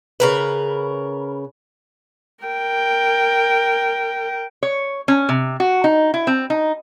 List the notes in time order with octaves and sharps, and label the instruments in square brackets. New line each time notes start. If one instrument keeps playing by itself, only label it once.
[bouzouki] C#3 A#4 B4
[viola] A#4 G5
[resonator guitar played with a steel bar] C#5
C#4
C3
F#4
D#4
E4
C4
D#4